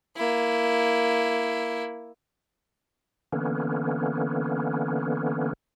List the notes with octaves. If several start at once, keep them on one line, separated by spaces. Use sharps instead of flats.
A#3 E4
D3 E3 A#3 B3 C#4